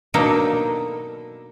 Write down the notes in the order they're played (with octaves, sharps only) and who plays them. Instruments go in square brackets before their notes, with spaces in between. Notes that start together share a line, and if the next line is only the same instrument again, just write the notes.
[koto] B2 F#3 A#3 D4 D#4 A4